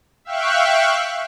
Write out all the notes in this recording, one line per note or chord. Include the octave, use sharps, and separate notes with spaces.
E5 F5 G5 C#6 F#6